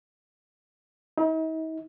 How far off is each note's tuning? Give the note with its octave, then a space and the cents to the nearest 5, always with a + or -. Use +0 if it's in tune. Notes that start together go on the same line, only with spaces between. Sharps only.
D#4 +45